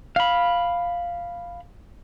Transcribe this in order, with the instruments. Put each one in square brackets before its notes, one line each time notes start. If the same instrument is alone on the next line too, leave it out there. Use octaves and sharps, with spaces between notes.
[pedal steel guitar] F5 B5